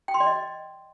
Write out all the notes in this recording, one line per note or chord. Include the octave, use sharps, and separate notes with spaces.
G5
C6
D5
D#5